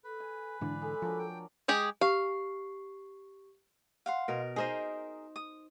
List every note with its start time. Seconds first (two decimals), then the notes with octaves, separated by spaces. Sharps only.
0.04 A4 B4
0.20 G#5
0.61 G#2 D3 E3 D4 D5 F5
0.82 G#3 A4 B5
1.02 F3 F#3 D4 A#4
1.19 G5
1.68 G#3 G4 G#4
2.01 G4 F5 C#6 C7
4.06 F5 F#5 C6
4.28 B2 A#4
4.56 D#4 G#4 A#4 C5 D#5
5.36 D#6